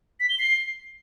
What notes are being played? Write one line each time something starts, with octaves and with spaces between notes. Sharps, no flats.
B6
G7
C7